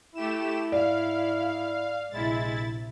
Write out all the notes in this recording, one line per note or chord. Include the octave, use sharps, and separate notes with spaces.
A3 E4 G4 E7
G#2 D5 F5
A#1 C3 G#3 E4 A6